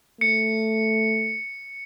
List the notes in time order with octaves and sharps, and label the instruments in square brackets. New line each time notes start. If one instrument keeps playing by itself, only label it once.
[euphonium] A3 [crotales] C#7